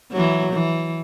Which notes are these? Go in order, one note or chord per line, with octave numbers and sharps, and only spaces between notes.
E3 F#3
E3